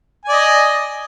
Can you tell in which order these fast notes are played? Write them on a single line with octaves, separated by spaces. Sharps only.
G#5 D5 D#5